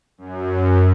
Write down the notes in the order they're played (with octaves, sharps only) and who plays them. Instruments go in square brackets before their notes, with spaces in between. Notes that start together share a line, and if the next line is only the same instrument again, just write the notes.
[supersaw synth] F#2